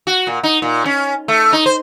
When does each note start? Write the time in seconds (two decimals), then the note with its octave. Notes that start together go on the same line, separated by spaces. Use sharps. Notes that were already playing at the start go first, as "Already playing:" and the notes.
0.07 F#4
0.27 A#2
0.43 D#4
0.62 A#2
0.85 C#4
1.28 A3
1.53 D#4
1.66 C5